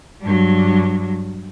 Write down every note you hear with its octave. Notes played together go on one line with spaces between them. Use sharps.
G2 F#3